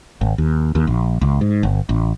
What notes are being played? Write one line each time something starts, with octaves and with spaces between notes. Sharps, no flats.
G#1
D#2
D#2
A#1
C#2
G#2
G1
A1